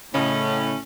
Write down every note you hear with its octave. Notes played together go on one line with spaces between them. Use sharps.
A2 C#3 C#4 D#5